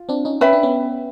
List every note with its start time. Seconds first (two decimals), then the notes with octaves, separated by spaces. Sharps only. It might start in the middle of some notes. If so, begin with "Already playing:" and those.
Already playing: F4
0.09 C4 D4
0.25 C#4 D#4
0.41 C#4 B4 E5 G5 B5
0.53 D4
0.63 B3 C#4